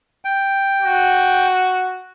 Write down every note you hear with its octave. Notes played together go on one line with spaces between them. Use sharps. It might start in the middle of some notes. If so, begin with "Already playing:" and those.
G5
F#4